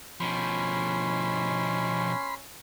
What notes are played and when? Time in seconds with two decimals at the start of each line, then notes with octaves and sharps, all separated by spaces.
0.20 B2 F3 C#4 B5 C6